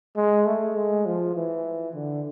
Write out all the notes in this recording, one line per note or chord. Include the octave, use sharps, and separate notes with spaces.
G#3
A3
G#3
F3
E3
D3